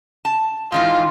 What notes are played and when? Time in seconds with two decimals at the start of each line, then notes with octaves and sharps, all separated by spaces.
0.25 A5
0.72 G#2 D#3 E3 F4